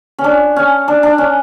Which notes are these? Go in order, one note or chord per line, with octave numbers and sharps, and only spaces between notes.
C#4
D4
C#4
D4
D4
C#4